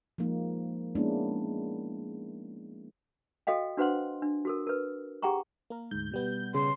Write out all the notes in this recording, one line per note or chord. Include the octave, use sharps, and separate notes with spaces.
F3 G#3 A#3 D#4
G#3 A#3 B3 C#4 D4 E4
F#4 A4 D#5 F5 G5
D4 F#4 B4 C5 F#5 C6
D4
F#4 A4 A#4
A#4 B4
G4 G#4 F#5 G5 A#5 C#6
A#3 A#4
D2 G#2 G6
B2 G3 B3
C#3 C6